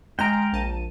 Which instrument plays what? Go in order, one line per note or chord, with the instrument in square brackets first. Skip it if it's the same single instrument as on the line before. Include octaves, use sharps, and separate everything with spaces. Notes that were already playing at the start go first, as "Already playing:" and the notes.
[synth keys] G#3 F6 D7 [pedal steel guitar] G5 A#5
[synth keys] A#1 A5 D#7